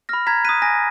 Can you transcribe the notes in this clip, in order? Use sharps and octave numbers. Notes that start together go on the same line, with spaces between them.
B5 F6 A#6
A#5 G#6 B6
D#6 F#6 B6 D#7
G#5 A#6